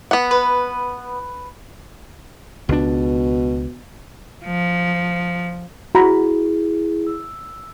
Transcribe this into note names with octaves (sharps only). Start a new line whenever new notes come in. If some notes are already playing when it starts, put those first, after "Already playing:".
B3 F#5
B4
C#2 B2 D4
F3
E4 F#4 G#4 A#5 B5
E6